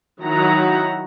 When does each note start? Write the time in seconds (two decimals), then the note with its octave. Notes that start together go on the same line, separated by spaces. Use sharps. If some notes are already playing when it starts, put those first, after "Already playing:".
0.21 D#3 F#3 D#4 E4 F#5 A#5